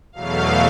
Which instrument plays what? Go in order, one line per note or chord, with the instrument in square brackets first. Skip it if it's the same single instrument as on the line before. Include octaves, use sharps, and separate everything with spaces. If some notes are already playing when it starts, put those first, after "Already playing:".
[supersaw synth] E2 B2 F#3 A3 F5